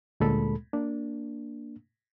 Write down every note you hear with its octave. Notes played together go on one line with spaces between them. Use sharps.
D2 A#2 G#3 A4 B5
A#3 D4